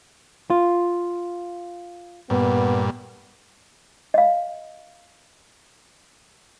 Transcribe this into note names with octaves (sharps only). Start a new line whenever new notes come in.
F4
G2 A#2 B3
D#5 F5